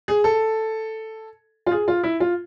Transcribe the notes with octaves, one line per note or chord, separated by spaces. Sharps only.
G#4
A4
F4
G#4
F4
E4
F4